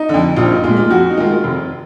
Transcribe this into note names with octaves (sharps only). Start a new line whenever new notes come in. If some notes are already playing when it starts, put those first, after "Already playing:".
Already playing: D#4
F2 D3
A#1 F4
D#4
A#2 G#3 F4
F4
F2 F#4
D#4
D#3 G#3 F4
F1